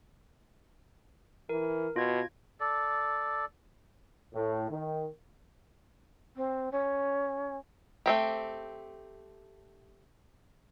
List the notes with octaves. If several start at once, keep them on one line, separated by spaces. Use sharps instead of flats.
E3 A#4
B2 F4 G#6
A4 D5
A2
D#3
C4
C#4
A3 C4 G4